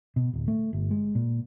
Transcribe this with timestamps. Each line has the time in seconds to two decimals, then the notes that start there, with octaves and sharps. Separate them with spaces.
0.16 B2
0.33 D1
0.48 A3
0.73 G1
0.91 G#3
1.15 A#2